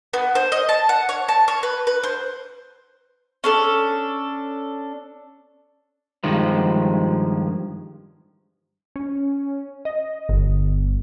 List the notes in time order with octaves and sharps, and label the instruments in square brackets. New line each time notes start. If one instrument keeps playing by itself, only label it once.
[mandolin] B3
C5
D#5
A5
F#5
C#5
A5
C#5
B4
B4
C5
C#4 D4 A4
[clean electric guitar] G2 D#3 F3 G#3
[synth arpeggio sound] C#4
D#5
G1